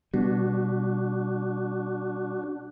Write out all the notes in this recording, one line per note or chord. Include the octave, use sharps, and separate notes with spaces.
B2 G3 D4 F#4